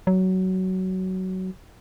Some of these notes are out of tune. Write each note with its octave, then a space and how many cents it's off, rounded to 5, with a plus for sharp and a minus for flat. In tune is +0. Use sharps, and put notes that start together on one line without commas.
F#3 +15